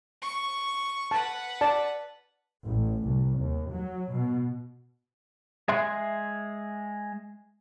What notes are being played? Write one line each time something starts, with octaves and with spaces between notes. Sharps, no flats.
C#6
B4 F#5 A5
D5 A5
A1
C2
D#2
F#3
B2
G#3 G#4 E5 C6 F#6